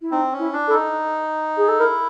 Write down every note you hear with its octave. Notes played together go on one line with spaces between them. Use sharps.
E4
C4 D#4
C#4
E4
D4
E4 A4
D#4
G#4
A4
E4 A#4